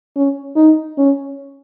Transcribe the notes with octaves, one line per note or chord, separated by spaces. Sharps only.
C#4
D#4
C#4